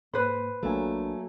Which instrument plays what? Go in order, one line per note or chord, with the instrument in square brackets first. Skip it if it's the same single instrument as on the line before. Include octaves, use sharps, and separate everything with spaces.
[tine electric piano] G#2 A#3 [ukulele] B4 C5
[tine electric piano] A#1 D4 F4 [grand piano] F#3 A#3 G#5 [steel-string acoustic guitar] A3